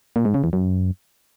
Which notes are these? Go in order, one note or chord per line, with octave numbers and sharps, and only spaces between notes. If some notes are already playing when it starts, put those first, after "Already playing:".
A#2
G#2
C#3
E2
F#2